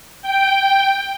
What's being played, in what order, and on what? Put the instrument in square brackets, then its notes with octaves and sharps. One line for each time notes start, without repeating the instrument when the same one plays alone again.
[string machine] G5